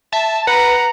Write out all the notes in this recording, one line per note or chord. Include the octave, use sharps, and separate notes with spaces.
E5 A5
B4 F#5 A#5